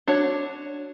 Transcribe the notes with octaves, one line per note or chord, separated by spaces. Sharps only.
D4 F#4 C#5